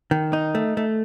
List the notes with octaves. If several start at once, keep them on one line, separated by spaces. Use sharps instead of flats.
D#3
D#4
A3
A3